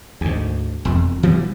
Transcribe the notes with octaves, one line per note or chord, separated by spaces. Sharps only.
D2 G#2
E1 F2
E3 G3 B3